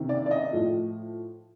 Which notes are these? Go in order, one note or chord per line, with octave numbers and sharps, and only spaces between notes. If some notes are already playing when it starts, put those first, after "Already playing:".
Already playing: C3 D#3
D5
D5
D#5
A2 F3